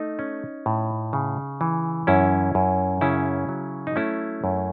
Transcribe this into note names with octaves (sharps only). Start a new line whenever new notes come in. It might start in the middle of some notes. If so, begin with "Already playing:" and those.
Already playing: A3 D#4
C#4
A2
C#3
E3
F#2 C#4 E4
F#2
C#3 C#4 E4
F#3
D#4
A3 C#4 E4
F#2